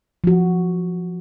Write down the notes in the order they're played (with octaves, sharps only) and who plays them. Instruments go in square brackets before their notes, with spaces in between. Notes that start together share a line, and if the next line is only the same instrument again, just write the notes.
[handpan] F3 F#4